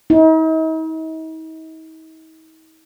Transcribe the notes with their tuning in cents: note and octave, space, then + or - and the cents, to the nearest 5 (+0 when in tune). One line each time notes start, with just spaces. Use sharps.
D#4 +45